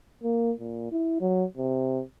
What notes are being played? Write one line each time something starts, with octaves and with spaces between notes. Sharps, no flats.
A#3
A#2
E4
F#3
C3